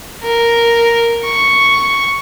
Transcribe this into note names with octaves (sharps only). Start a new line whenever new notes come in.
A#4
C#6